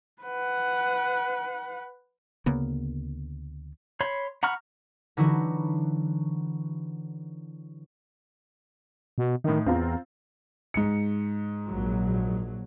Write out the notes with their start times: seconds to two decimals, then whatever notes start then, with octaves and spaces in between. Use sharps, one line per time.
0.22 B4 F#5
2.46 D2 C#3 A#3 B3
4.01 C#5 B5 C6
4.43 F#5 A#5 B5 C#6 F6
5.17 D3 E3 F#3 D#4 E4 F#4
9.18 B2
9.44 A2 D#3 D#4
9.66 E2 C4 F4 A#5
10.74 G#2 C#7
11.67 A#1 F#3